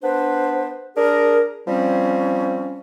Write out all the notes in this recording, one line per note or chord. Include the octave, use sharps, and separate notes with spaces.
B3 D4 B4 C5
D4 G#4 A#4
F3 G3 C4 C#4